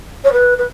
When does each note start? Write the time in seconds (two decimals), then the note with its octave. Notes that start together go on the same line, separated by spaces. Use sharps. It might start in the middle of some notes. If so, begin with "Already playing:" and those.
0.24 C#5
0.32 B4
0.58 B4